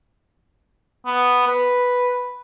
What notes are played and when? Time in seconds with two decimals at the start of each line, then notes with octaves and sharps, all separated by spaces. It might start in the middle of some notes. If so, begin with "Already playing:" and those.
1.06 B3
1.47 B4